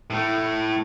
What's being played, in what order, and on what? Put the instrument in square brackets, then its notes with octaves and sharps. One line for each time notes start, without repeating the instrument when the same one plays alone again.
[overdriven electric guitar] A2 A3